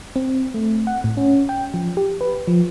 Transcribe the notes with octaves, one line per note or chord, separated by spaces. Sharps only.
C4
A3
F#5
A2
C#4
G5
F3
G4
B4
F3